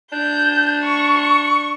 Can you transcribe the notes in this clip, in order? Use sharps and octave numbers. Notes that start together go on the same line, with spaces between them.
D4 G6
C#6